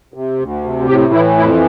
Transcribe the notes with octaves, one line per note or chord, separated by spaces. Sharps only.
C3
D2
C3
A2 G4
E3 E4
F2 E4